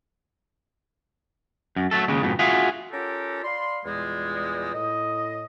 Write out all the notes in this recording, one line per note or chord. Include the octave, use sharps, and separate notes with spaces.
F#2
F#3 A3 A4
D#2 C#3 G#3
F2 G#2 B2
F4 F#4 G#4 E5 F5
C#4 F4 G4 A4 A#4
D5 F5 B5 C6
E2 A#2 G3 G#3
A2 D#5